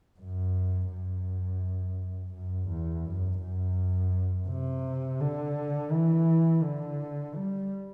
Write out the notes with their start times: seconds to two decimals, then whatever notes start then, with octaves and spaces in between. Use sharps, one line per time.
0.19 F#2
0.91 F#2
2.34 F#2
2.69 E2
3.05 F#2
3.41 F#2
4.48 C3
5.20 D3
5.91 E3
6.62 D3
7.34 G3